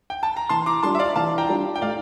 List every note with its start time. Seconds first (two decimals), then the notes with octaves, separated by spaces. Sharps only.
0.10 G5
0.23 A5
0.37 A#5
0.49 E3 A5 C6
0.66 A#5 D6
0.83 G3 D4 F4 A5 C6
0.95 E5
0.99 D5 F5
1.16 E3 F5 A5
1.38 G5 A#5
1.49 G3 D4 F4
1.76 G5
1.81 A2 D5 F5